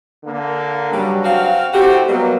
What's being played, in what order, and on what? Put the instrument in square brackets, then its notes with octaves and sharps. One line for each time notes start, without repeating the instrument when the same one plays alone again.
[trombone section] D3 A#3
[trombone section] G2 C#3 F#3 [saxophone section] G3
[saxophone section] C4 F#4 F5
[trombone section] A2 A3 C4 [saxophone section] F#4 G4
[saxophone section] B2 G3 [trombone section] F#3 A#3